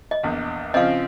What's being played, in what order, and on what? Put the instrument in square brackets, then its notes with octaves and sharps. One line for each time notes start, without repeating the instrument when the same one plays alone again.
[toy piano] D#5
[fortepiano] A#1 E2
[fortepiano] C#3 F3 C4 [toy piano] D#5 F5